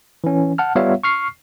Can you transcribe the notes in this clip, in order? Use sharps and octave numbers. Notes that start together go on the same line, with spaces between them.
E3 C#4
F#5 A5 F6
G3 B3 F4 C#5 E5 F5
C#6 F6 C7